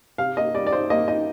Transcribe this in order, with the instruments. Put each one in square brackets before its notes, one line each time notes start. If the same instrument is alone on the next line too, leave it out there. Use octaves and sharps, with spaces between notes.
[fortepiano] C3 F5
A#3 D#5
G3 D5
D5
D#4 C5
A#3 D#5
D#4 D#5